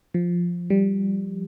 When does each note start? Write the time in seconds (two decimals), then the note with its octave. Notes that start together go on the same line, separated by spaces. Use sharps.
0.14 F3
0.70 G3